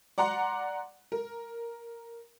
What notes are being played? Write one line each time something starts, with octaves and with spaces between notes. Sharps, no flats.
D5 F#5 A#5 C6
A#4